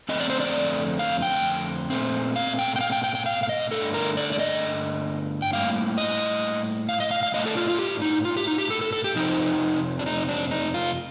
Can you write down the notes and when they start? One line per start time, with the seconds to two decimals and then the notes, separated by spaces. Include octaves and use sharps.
0.09 F2 D3 A3 C4 D#5
0.20 D5
0.30 C5
0.40 D5
0.99 F5
1.22 G5
1.90 A#2 A3 C4
2.36 F5
2.59 G5
2.76 G5
2.81 F5
2.92 G5
3.04 G5
3.15 G5
3.26 F5
3.43 F5
3.49 D#5
3.71 G2 D3 A3 D4 A4
3.94 A#4
4.17 D5
4.32 D5
4.39 D#5
5.42 G5
5.53 A2 G3 A#3 F5
5.98 D#5
6.89 F5
7.00 D#5
7.11 F5
7.23 F5
7.34 A2 A3 D4 D#5
7.46 A4
7.57 F4
7.68 F4
7.79 G4
8.02 D#4
8.25 F4
8.37 G4
8.47 D#4
8.58 G4
8.70 A4
8.81 A4
8.93 A4
9.04 G4
9.15 F2 C3 F3 C4 D#4
9.99 D4
10.06 D#4
10.29 D4
10.51 D#4
10.74 F4